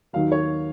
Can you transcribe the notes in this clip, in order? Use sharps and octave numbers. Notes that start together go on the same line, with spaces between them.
D#2 D#3 F#3 F5
C#5